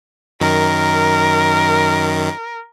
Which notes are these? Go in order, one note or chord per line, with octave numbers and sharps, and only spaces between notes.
F#2 D#3 A#4